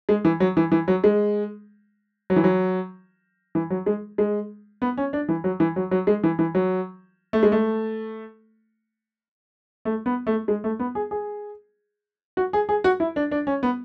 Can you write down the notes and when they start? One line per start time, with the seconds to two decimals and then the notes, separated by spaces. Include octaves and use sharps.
0.09 G#3
0.25 E3
0.40 F#3
0.57 E3
0.72 E3
0.88 F#3
1.04 G#3
2.30 F#3
2.36 E3
2.44 F#3
3.55 E3
3.70 F#3
3.86 G#3
4.18 G#3
4.82 B3
4.97 C#4
5.13 D4
5.29 E3
5.44 F#3
5.60 E3
5.76 F#3
5.91 F#3
6.07 G#3
6.24 E3
6.39 E3
6.55 F#3
7.33 A3
7.43 G#3
7.52 A3
9.85 A3
10.06 B3
10.27 A3
10.48 G#3
10.64 A3
10.79 B3
10.95 G#4
11.11 G#4
12.37 F#4
12.53 G#4
12.69 G#4
12.84 F#4
13.00 E4
13.16 D4
13.31 D4
13.47 C#4
13.63 B3